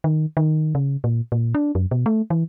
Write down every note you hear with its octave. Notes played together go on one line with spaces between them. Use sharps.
D#3
D#3
C#3
A#2
A#2
D4
F#2
B2
A3
E3